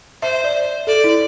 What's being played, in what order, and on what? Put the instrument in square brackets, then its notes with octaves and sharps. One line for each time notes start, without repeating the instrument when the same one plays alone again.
[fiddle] C5 [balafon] E5
[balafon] D5
[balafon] A4 [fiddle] D5
[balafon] E4